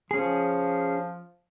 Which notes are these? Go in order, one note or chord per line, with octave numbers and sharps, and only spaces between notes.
F3 C#4 G#4